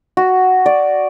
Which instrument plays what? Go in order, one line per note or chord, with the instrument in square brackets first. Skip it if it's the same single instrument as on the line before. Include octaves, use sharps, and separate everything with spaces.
[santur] F#4
D5